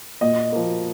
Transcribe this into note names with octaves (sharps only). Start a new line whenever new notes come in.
A#2 D#5
F3 A#3